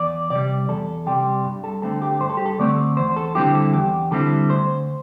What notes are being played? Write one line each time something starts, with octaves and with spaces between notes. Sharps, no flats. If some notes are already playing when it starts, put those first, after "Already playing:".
Already playing: E2 D5
C3 G3 D5
E2 A4
C3 G3 G4
G2
A4
D3 A3 C4 A4
G4
G2 C5
A4
G4
A4
D3 A3 C4 D5
E2 C5
A4
D3 G3 C4 E4 G4
A4
E2 G4
D3 G3 C4 E4 A4
D2 C5